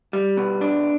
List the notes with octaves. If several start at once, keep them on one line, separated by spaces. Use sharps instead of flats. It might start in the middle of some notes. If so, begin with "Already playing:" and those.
G3
B2
D4